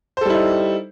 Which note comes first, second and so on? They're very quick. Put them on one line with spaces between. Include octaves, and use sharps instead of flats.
C5 A4 G3 E4 D#4